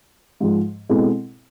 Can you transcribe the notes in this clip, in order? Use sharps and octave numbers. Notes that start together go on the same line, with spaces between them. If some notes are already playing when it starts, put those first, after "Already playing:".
G#2 F3 G#3
B2 G#3 C4 E4 A4